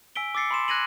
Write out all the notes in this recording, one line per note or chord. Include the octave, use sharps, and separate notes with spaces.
G#5 E6 B6 D7 G7
D6 E6 A6 C7 C#7
B5 C6 E7
F#6 G#6 A#6 D#7 F#7